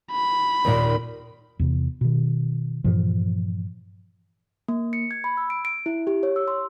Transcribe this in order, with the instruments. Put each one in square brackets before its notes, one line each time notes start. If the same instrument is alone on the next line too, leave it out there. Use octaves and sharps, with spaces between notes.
[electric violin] B5
[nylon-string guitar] D#2 A#2 D#3
[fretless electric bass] E2 C3
B2 D#3
G2 A#2 E3 F3
[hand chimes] A#3
C#7
G#6
B5
E6
D7
D7
E4
G4
C#5
E6
C6